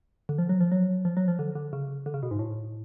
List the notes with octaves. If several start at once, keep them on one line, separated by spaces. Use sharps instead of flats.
D3
F3
F#3
F3
F#3
F3
F#3
F3
D3
D3
C#3
D3
C#3
B2
G#2
A2